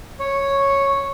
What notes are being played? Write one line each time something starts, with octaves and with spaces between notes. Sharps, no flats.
C#5